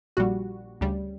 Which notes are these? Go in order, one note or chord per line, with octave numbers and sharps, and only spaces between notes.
A#1 A#2 G3 F#4
D2 C#3 G3